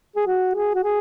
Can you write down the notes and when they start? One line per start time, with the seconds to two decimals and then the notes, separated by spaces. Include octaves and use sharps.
0.16 G#4
0.26 F#4
0.55 G#4
0.74 F#4
0.84 G#4